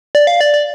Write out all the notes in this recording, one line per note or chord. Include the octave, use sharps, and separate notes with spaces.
D5
F5
D5
D5